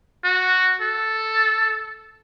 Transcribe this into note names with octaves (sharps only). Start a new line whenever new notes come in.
F#4
A4